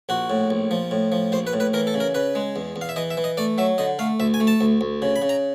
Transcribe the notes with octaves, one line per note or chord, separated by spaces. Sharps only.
A#1 F#4
A2
A#1
F3
A2
F3
A#1 C5
B4
A2
B4
E3 A#4
A4
C#3
A#4
C#3 B4
G#3
E2
E2
F5
E5
E3 D#5
E5
E3
D#5
A3 D5
F#3 E5
D3 D#5
A3 F5
D2 E5
G#5
A3
A5
D2
D2
C#3
B5
C#3
A#5